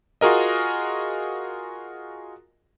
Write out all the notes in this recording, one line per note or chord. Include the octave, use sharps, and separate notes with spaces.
F4 F#4 G#4 A#4 D#5